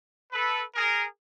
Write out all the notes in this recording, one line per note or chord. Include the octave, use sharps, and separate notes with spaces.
A4 B4
G#4 A#4